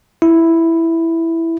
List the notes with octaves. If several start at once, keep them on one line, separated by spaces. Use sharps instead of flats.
E4